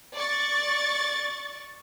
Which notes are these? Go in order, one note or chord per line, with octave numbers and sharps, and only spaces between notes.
D5 C#6 A6